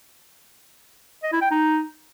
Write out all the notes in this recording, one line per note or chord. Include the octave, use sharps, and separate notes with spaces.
D#5
E4
G5
D#4